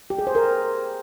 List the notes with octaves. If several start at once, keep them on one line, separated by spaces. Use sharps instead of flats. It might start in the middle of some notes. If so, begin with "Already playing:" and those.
G4
G#4
C5
A#4